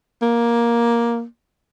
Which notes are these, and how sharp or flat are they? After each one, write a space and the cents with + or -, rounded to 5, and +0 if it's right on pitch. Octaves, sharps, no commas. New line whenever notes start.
A#3 +10